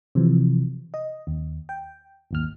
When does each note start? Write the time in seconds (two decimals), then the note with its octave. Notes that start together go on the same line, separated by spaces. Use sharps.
0.15 C3 E3 F3
0.94 D#5
1.27 D#2
1.69 G5
2.31 G#1 D#2 F6